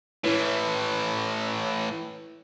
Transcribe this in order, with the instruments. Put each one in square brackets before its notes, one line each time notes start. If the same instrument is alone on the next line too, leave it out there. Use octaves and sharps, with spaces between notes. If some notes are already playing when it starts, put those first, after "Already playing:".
[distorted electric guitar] A2 E3 [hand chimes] E4 B4 C#5